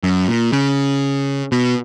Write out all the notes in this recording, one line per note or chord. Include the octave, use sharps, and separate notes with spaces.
F#2
A#2
C#3
B2